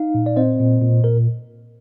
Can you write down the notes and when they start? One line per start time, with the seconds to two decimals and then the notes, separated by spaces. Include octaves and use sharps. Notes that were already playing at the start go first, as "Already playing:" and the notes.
Already playing: D#4 F5
0.14 A#2
0.26 D5
0.36 C4 C5 D#5
0.60 A#2
0.82 A#2
1.04 A#2 A#4